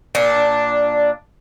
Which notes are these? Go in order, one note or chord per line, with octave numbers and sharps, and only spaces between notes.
A#2 D4